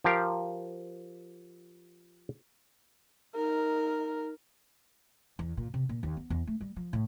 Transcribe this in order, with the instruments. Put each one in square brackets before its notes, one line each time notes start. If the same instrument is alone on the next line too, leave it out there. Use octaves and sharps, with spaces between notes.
[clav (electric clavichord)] F3 G4 A#4 F5
[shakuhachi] D#4 [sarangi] A#4
[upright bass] E2
A#2
C3
A#2
D#2
B3
E2
A3
G3
F3
A2